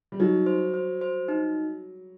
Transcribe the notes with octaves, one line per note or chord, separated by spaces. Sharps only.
G3
F#3 D#4
C5
C5
C5
D#4